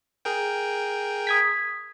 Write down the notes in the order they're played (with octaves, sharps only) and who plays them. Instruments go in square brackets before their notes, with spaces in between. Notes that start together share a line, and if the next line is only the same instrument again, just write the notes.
[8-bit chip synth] G#4 A#4 G5
[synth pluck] D#6 G#6 B6